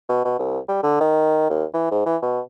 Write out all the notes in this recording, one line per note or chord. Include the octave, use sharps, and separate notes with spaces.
B2
B2
C2
G3
D3
D#3
D#2
E3
G#2
E3
B2